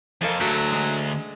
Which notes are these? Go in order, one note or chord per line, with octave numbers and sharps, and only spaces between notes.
F2 A#3 A4 G#5
D2 F#3 G4 A4 E5
G#3 G#4